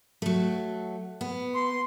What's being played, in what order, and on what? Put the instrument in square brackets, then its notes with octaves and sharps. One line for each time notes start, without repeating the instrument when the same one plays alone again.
[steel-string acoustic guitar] F#3 A3
B3
[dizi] C6